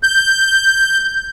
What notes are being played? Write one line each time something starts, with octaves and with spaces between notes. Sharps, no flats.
G6